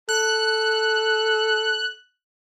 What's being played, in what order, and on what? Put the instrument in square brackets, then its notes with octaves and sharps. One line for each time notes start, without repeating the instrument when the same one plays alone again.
[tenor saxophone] A4 [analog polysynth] F#6